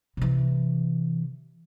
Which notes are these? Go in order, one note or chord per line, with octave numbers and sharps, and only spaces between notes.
C3 E3